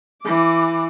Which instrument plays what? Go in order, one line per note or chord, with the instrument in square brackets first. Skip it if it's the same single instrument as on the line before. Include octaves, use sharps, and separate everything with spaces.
[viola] E3 D6